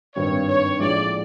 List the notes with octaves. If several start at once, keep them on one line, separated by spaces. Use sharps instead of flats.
G#1 G2 D#3 G3 C4 C#5
C#5
A#1 A2 F3 G#3 D5